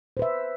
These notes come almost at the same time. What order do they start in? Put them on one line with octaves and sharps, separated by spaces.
C5 B4 E5